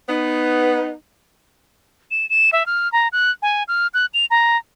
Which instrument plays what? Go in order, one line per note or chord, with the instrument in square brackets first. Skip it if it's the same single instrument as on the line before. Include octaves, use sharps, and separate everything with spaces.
[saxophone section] B3 D#4
[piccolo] E7
E7
E5
F6
A#5
F#6
G#5
F6
F#6
F7
A#5